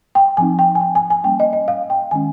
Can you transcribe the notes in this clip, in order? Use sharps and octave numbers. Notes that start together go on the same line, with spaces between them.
G5
F3 C4 D#4 G#5
G5
G#5
G5
G#5
G#5
G3 A#3 C#4 G5
D#5
D#5
F5
G5
D#3 G#3 C#4 G#5